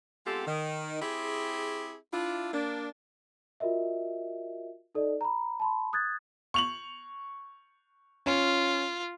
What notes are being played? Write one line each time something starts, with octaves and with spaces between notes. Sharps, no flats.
G#3 B3 C4 F4 G4 A4
D#3
C4 E4 G4 G#4
D4 E4 F4
A#3 D4
F4 F#4 A#4 D#5 E5
D#4 A4 D5 D#5
A#5 B5
A5 B5 C6
D#6 F#6 G#6 A6
C#6 F7 F#7
C#4 F4